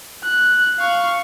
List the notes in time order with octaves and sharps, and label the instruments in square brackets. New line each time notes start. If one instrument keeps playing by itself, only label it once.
[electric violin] F#6
F5 C#6